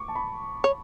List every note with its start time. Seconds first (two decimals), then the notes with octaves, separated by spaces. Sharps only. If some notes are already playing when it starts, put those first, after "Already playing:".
Already playing: C#6 D6
0.08 A5
0.15 B5
0.64 C#5